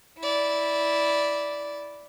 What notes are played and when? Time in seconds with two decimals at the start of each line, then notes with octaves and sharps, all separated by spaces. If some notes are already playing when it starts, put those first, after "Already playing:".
0.19 E4 D5